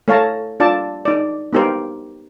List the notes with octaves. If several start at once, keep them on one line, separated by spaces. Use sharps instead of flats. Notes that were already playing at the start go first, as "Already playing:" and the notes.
A3 C#5 F5 A5 A#5
D4 F4 D5 A5
D#4 D5
B3 D#4 G4 A#4 C5